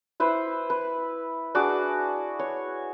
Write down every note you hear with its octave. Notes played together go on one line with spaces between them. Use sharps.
E4 B4 C5 E5
B4
D4 F#4 G#4 D6
C#5